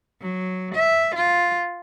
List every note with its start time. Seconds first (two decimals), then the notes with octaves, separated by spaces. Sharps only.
0.21 F#3
0.74 E5
1.15 F4